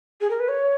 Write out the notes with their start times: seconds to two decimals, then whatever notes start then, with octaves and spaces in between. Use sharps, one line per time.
0.21 G#4
0.30 A#4
0.40 B4
0.48 C#5